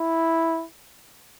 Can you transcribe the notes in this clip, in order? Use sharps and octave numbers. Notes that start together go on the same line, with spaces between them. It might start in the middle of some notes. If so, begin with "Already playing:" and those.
Already playing: E4